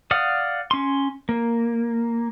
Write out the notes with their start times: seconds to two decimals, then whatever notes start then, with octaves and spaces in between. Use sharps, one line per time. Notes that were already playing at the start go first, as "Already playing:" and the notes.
0.11 D5 F5 F#5 D#6
0.71 C#4 C6
1.29 A#3